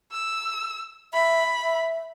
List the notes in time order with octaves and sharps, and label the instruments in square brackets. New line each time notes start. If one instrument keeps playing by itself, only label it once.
[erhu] E6
[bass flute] E5 [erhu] B5
[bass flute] E5